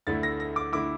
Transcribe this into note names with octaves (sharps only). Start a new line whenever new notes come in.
D2 D3 A3 E4 A6
A#6
A#6
D6
D3 A3 E4 D6